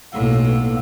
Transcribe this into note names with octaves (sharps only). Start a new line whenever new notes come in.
B1 A2 A#3 B3 A4